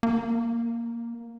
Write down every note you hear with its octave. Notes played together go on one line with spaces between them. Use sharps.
A#3